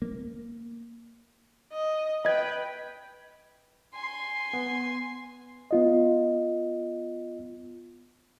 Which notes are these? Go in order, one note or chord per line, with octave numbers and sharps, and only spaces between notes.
A#3
D#5
B4 D#5 G5 G#6
G#5 C6
B3
B3 F4 D#5